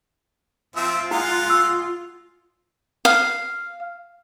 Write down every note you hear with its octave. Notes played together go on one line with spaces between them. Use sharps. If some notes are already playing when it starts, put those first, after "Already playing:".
F3 C4 F4 E5
G#3 E4 F5 F#5
E6
F5